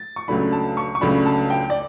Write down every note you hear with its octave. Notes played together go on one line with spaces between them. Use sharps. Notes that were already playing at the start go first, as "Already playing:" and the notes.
Already playing: A6
C#6
C#2 C#3 F#3 A3 D4 B5
A5
C#6
C#6
C#2 C#3 F#3 A3 D4 B5
A5
G5
D5